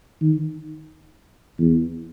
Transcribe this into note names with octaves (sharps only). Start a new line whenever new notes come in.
D#3
E2